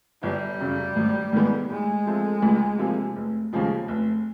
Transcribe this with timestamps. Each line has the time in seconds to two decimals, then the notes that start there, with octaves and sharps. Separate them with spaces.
0.23 G1 G3
0.60 F#2 C#3 F#3
0.96 G#1
1.33 G#2 D#3 G#3 B3
1.70 A2 G#3
2.06 F3 A3 C4
2.42 C#2
2.79 C3 F3 A#3
3.16 F1
3.53 D#2 C#3 F3 G#3
3.88 F1